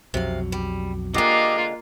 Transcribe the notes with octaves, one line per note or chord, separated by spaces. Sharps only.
B1 F2 C3 F#3 F5
G3
D3 G#3 A#3 F4 G4 D#5